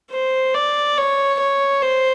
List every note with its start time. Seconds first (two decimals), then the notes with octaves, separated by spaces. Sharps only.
0.11 C5
0.54 D5
0.97 C#5
1.39 C#5
1.82 C5